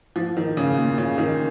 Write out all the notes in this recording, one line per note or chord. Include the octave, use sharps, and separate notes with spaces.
F3
D#3
C#3
A#2
C#3
D#3